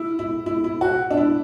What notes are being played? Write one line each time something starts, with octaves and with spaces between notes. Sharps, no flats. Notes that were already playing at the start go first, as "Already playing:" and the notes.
Already playing: E4
E4
E4
E4
F#4
D4
E4